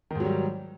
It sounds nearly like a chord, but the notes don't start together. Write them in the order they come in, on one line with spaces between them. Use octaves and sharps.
D#3 G#2 F#3 G3